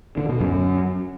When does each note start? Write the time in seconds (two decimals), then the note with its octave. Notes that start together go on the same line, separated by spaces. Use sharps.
0.18 D3
0.29 B2
0.40 F#2